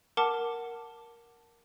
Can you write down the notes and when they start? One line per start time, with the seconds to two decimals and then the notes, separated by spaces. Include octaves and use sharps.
0.17 A#4 F#5 A5 D6